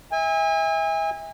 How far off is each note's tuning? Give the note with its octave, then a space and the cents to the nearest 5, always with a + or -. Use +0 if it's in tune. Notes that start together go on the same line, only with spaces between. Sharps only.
E5 -30 G#5 -35